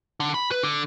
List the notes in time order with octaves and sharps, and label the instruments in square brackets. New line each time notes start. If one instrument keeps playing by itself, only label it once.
[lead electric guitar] D3
B5
B4
D3